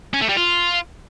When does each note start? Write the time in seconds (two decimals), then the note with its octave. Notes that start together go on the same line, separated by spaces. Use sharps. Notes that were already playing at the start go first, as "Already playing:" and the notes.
0.13 C#4
0.21 A3
0.29 G3
0.37 F4